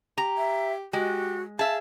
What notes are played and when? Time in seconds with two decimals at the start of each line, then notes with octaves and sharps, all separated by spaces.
0.18 G4 A#5
0.38 E5
0.93 G#3 F#4 G4
1.59 G#4 E5 F5 A5